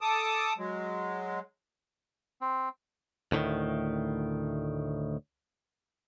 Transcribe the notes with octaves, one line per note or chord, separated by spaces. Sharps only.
A4 A5 D6 D#6
F#3 G#3
C4
D2 A2 D3 D#3